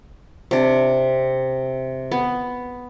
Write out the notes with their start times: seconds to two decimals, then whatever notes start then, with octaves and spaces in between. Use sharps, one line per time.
0.51 C3 D4
2.11 B3